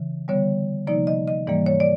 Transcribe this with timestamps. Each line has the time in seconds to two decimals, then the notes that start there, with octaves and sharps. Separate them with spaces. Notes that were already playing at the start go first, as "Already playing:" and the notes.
Already playing: C#3 E3
0.28 D3 G3 B3 C#5
0.87 C3 F3 A#3 D#4 D5
1.07 D#5
1.28 D#5
1.47 G#2 E3 G3 A#3 D5
1.66 C#5
1.80 D5